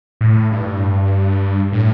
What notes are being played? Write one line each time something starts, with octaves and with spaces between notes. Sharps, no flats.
A2
G2
A2